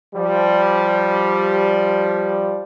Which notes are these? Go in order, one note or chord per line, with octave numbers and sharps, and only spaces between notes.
F3 G3